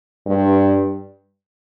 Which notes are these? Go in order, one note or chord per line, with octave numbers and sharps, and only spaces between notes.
G2